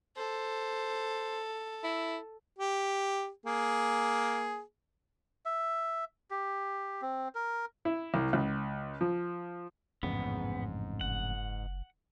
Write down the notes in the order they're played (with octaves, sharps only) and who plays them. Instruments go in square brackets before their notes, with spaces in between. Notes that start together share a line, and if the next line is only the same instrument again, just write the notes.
[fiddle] A4 [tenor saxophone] C5
[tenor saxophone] E4
[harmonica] G4
A#3 G#4
[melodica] E5
G4
C4
A#4
[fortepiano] E4
C2
C#2
F3
[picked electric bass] A1 F2 C#3 [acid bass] G#2 [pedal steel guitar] B3
[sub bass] F#1 [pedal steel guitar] F#5